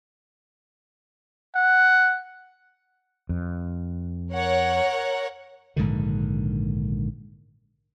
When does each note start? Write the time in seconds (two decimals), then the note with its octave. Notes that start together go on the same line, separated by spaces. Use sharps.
1.56 F#5
3.29 F2
4.32 A#4 C#5 F#5
5.76 A#1 G#2 D3 D#3